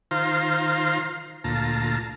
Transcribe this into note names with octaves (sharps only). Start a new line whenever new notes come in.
D#3 F4 C5 F5 A#5 C6
D2 A#2 F4 A5 A#5